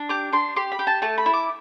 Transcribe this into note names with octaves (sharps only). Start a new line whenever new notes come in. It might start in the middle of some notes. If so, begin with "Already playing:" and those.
Already playing: D4
G4 D6
D4 C6
G4 C6
B5
G4
A5
A3 A5
B5
E4
D6